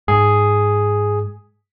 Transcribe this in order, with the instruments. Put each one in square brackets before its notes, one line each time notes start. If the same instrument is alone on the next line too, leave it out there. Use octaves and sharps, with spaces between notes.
[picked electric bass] G#2 [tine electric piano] G#4